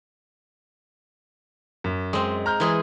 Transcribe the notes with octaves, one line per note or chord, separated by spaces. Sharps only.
F#2
G#3 C4
A#5 F6 G6
E3 G#3 G#4